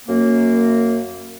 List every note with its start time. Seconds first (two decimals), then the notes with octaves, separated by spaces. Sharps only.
0.07 F#2 A#3